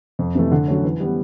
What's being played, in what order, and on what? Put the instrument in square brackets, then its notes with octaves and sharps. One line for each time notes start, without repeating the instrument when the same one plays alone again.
[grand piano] F2
C3 E3 A3
D3
F#3 A3 C#4
E3
G3 B3